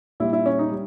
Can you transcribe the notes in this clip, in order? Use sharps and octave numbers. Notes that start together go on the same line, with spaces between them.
A#2 G3 E4
E4
C#4
D#4
G3